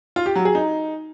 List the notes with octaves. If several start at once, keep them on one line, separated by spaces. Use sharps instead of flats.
F4
G4
F#3
G#4
D#4